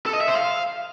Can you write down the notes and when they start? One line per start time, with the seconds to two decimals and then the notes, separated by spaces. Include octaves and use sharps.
0.06 A4
0.13 D#5
0.21 E5
0.28 C5
0.35 F5